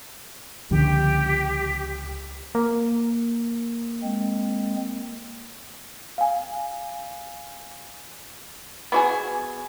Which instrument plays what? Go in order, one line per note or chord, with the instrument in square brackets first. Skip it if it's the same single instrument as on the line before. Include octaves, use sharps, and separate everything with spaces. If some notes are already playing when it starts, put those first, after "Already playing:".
[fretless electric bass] C#2 [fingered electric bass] D3 F3 A#3 [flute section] G4
[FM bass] A#3
[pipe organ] G#3 C4
[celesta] F5 G#5
[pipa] B3 F#4 G#4